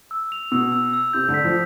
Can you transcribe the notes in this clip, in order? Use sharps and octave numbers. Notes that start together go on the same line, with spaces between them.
E6
F7
B2 E6
E6
E6
C3 G6
D3
B6
F3